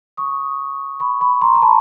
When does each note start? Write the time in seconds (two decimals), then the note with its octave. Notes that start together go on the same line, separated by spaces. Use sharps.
0.17 C#6 D#6
1.00 B5 C#6
1.21 B5 C#6
1.41 A#5 C6
1.56 A#5
1.62 A5 B5